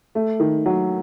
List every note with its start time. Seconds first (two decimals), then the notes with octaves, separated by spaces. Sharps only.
0.15 A3
0.40 D#3
0.66 F#3